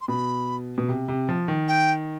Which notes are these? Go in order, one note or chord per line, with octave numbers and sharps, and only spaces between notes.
C6
B2 B5
B2
C3
C3
F3
D#3
G5